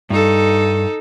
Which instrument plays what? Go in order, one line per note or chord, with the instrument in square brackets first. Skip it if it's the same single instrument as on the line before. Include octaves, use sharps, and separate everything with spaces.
[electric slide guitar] G2 [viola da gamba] D#4 A4